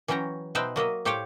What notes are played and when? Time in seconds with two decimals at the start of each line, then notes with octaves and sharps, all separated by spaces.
0.08 E3 F#3 C#4 G5 A#5
0.55 B2 D#4 B4 C5 E5 G5
0.76 F#3 A#3 D#5 E5
1.05 A2 G4 C5 C#5 F5 G5